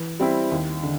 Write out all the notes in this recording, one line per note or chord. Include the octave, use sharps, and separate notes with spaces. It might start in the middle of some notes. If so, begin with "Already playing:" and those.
Already playing: E3
G3 C4 E4
D#2
D3